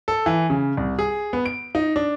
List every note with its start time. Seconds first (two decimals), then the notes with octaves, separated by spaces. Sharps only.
0.08 A4
0.26 E3
0.50 C#3
0.77 C2
0.99 G#4
1.33 B3
1.46 D7
1.75 D#4
1.96 D4